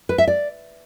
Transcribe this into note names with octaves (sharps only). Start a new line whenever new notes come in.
B4
E5
D5